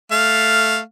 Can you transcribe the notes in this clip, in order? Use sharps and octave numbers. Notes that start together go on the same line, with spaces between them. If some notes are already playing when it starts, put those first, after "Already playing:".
A3 F5